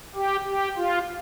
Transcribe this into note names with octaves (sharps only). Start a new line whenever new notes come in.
G4
G4
F4